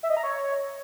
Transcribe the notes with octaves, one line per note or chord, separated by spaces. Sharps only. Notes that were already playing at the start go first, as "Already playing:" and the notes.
E5
D#5
A#5
C#5